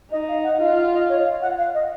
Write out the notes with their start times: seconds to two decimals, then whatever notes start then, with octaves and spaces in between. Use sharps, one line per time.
0.11 D#4 D#5
0.28 F5
0.44 F#5
0.60 F4 F5
0.77 F5
0.93 D#5
1.09 C#5
1.25 F5
1.42 F#5
1.58 F5
1.74 D#5